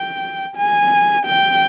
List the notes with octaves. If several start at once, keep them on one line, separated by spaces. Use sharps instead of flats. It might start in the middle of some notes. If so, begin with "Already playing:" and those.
Already playing: G5
G#5
G5